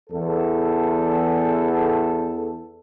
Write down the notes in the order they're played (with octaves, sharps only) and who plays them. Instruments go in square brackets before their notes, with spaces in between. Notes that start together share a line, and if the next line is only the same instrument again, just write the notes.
[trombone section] E2 A4